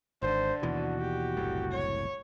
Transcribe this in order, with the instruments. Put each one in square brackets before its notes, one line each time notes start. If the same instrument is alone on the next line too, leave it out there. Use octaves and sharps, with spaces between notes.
[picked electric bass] G#1 [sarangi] D3 [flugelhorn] C5
[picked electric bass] D#2 B2 E3 [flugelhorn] F#4
[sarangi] G4
[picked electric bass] F#1 C2 A2
[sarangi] C#5